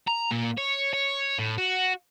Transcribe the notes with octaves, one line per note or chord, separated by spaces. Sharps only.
A#5
A#2
C#5
C#5
A2
F#4